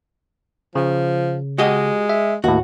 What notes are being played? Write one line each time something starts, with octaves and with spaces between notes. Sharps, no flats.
C#3 F3
G#3 F#4 G4 D#5
E5
D#2 A2 F#4